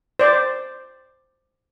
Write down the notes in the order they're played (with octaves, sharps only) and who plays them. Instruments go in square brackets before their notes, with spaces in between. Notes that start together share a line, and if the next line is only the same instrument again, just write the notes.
[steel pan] C5 D5